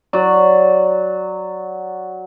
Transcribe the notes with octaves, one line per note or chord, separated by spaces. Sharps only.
F#3 D5